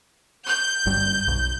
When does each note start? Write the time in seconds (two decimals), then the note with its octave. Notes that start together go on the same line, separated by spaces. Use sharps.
0.46 G6
0.86 G1 F#2 G3
1.28 B1